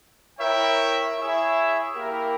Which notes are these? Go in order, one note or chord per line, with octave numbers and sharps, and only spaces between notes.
E4 A#4 C#5 E5 G5
E4 G#4 C#5 E5
A#3 E4 G4 A#4